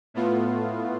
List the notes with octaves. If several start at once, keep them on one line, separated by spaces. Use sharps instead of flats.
A2 A3 B3 F4